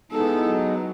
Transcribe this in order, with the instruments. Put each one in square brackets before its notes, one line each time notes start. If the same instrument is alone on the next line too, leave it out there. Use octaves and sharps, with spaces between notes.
[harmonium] G#3 B3 D#4 [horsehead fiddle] E4 A4
[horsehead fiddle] F#3